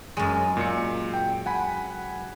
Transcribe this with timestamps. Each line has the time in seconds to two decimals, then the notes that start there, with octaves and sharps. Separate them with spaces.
0.17 F#2 G#3
0.57 A#2 C#7
1.14 G5
1.46 F#5 G#5 B5